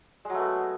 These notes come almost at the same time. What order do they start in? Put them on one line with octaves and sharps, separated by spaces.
G#3 F#3 A3 B3